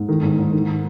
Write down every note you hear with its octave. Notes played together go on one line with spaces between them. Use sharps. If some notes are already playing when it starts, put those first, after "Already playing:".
Already playing: G#2
D#3
G#2
G#2
D#3